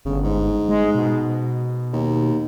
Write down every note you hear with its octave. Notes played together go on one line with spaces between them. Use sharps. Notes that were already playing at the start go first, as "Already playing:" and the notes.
G1 C#3
G#2
G#3
B2
D#2